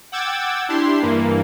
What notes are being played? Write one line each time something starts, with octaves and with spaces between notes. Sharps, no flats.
F#5 G5 D6 E6 G#6 A6
D4 E4 G4 C6
G2 E3 A#3